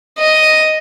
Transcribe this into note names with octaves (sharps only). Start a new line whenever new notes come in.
D#5